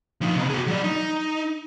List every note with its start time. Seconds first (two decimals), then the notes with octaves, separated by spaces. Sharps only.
0.21 F3 D#4
0.36 C3 B3
0.49 F#4 G#4
0.68 F#3 D5
0.84 D#4